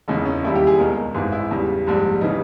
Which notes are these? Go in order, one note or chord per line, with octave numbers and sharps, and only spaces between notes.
E1 E2 C#3 D#4
C#4
D#2 D#3 G3 E4
G4
G#4
C#2 B2 G#3 A#4
G#1 G#2 E3 G#4
E4
E2 C#3 G3
A#1 G#2 G3
C#3 E3 G3 D#4